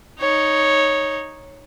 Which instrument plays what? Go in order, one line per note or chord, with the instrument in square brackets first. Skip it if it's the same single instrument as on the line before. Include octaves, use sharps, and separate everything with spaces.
[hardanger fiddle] D#4 C#5